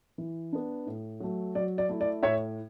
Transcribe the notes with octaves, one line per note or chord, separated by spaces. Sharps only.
E3
B3 D4
A2
F#3 A3
F#3 D5
D5
A3 E4
D5
A2 C#5 E5